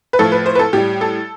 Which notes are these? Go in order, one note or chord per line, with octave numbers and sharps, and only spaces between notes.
B4
A2 F3 A3 A4
B4
C5
B4
A4
A2 G3 G4
A4